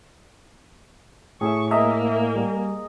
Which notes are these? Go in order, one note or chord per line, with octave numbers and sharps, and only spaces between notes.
A2 G#4 E5 C#6
A#3 D#5 E5 A#5
G3